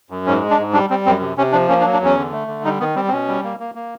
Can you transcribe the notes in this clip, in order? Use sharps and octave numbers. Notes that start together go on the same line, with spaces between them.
F#2
G#2 C#4
G#3
D4
G#2
G3 D4
G3 C4
F#2 C4
C3
C3 C#4
F3 D4
A#3 C#4
D4
F#3
D4
E2 C#4
D3
A3
D3
G3 D#4
D#3 B3
G3 C4
C4
B2 C#4
G3
A#3
A#3
A#3